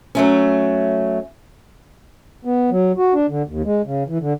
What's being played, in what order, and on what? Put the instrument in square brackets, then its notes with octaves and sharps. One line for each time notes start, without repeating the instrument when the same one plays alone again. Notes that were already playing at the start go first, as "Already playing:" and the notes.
[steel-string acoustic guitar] F#3 A3 C#4
[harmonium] B3
F#3
F#4
D4
D3
D#2
G#3
C#3
E3
D3